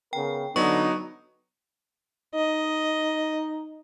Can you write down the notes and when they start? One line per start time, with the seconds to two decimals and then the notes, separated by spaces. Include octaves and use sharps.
0.13 C#3 B3 A#4 G5
0.56 D3 F#3 B3 D#4 C#6
2.35 D#4 D#5